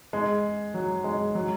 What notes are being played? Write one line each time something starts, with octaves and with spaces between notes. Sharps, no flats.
G#3
F#3
G#3
F#3